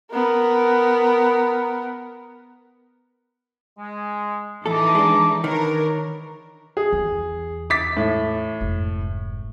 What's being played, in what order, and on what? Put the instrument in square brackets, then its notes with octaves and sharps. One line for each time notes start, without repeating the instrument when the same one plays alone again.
[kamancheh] B3 A#4
[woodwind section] G#3
[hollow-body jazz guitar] A2 A4 [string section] E3 D#4 [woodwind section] A5 D6
[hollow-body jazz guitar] G#3 D4
[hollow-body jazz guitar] D#3 [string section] D4 A#4 [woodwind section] B4 C#5
[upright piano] G#4
[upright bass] E2
[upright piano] D6 A6 B6
A2
[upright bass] F1 G#2